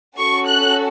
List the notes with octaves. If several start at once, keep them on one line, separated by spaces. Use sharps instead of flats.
C#4 F#4 A4 C#6
F#6